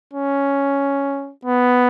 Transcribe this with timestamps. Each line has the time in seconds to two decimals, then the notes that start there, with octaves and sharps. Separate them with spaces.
0.13 C#4
1.45 B3